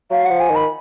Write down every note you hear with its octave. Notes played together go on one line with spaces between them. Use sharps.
F#3 F5
F3 F#5
G#5
D#3 B5